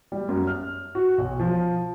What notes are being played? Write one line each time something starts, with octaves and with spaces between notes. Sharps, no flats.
G3
F#2
F6
F#4
B1
F3